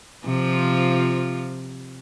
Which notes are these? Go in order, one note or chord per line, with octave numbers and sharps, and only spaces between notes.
C3 F3 F4